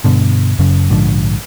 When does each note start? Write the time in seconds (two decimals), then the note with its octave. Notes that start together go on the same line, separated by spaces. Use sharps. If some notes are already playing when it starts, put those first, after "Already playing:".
0.04 G2 B2 D3
0.59 F#2 C#3
0.90 A#1 G#2 D3 F3